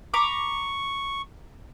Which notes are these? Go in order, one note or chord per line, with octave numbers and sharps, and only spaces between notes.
A#5 B5 C#6 D6